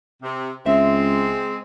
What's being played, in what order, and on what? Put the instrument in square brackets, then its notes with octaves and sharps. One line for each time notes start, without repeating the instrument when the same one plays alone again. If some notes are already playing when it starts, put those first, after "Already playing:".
[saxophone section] C3
[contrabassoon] C#2 [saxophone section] G#3 C4 [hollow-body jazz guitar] E5